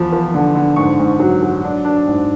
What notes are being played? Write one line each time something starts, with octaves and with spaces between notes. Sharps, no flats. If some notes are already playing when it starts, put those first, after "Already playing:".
Already playing: E2 F3 B5
F3
D3
D3
G#2 C#6
G#2
F#3
F#3
D4
D4
G#2